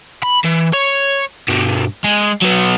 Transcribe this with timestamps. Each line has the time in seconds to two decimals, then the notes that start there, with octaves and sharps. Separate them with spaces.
0.23 B5
0.45 E3
0.73 C#5
1.48 G2 B2
2.04 G#3
2.42 F#3 B3